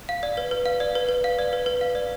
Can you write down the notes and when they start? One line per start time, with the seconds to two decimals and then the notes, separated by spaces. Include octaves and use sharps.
0.09 F5
0.23 D5
0.37 B4
0.51 B4
0.66 F5
0.80 D5
0.95 B4
1.09 B4
1.24 F5
1.39 D5
1.53 B4
1.66 B4
1.81 F5
1.95 D5